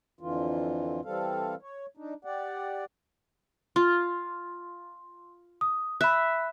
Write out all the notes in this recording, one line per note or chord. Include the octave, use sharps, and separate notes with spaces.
F2 D3 E3 F4
E3 G3 C4 A4 F5
C#5
D4 D#4
G4 D5 F#5
F4 C6
D#6
E5 B5 F#6